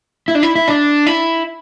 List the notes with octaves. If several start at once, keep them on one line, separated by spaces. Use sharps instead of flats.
E4
D4
E4
E4
D4
E4